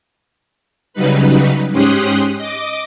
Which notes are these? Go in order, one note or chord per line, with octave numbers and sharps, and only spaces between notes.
C#3 F#3 G3 D#4 B4
G#2 C#4 G4 C6 D#6 F#6
D#5 D6